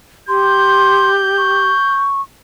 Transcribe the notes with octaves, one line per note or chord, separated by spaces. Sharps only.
G4 C6 G6
C#6